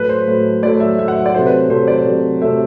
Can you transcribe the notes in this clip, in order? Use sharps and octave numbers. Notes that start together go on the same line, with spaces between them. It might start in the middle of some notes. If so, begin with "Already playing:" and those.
Already playing: A2 F#3 A3 B4
C5
A2 F#3 A3
A2 F#3 A3 D5
E5
A2 F#3 A3 E5
F#5
E5
D5
C3 F#3 A3 C5
B4
C3 F#3 A3 C5
D5
C3 F#3 A3
C3 F#3 A3 E5